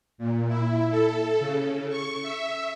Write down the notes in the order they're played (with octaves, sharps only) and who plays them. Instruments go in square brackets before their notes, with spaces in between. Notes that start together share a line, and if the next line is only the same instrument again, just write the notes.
[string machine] A#2
E4
A4
C#3
C#6
E5